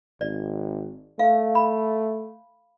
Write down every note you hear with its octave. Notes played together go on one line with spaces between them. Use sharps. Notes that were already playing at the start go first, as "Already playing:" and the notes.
G#1 D5
A3 F5
B5